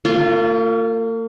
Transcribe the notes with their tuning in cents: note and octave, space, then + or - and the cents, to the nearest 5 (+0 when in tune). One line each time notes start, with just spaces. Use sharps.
A#3 -45 F4 +0